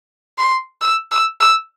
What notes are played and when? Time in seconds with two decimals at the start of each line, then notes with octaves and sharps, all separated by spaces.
0.38 C6
0.82 E6
1.11 E6
1.41 E6